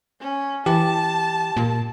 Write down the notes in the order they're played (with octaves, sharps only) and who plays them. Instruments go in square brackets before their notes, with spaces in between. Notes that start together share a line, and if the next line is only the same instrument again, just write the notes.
[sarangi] C#4
[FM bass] E3 [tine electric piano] G4 [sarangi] A5
[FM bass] A#2